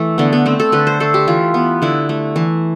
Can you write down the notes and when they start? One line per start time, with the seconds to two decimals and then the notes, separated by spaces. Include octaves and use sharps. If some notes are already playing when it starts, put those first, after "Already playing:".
Already playing: E3 A3
0.18 D3 B3
0.33 B3
0.46 A3 C4
0.60 A4
0.72 D3 B4
0.87 C5
1.00 A3 A4
1.14 G4
1.27 E3 F4
1.54 B3
1.82 D3 E4
2.09 A3
2.36 E3